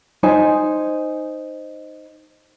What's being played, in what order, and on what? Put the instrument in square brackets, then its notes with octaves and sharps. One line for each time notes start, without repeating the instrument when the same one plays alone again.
[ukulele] D#4 C5 G#5